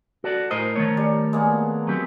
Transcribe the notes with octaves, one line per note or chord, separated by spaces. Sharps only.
F#4 A4 D5
A2 A#4 C5 D#5
D#3 A3 C#5
G3
G#3 A#3 B3
F#3 C4 G4